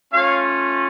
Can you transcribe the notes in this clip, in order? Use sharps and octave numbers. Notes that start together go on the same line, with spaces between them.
A3 C#4 F4 C#5 F5